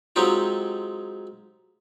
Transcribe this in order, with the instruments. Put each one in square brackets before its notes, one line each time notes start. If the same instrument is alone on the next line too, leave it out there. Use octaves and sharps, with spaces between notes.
[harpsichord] F#3 G#3 C4 D#4 F4 G4